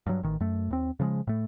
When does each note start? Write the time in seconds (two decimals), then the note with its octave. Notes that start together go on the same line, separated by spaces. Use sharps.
0.07 G2 F#3
0.23 A1 D#3
0.40 F#2 A3
0.71 D#2 C4
1.00 C#3 F3 G3 G#3
1.27 A2 A3